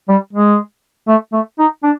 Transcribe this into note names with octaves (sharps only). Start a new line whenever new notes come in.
G3
G#3
A3
A3
D#4
D4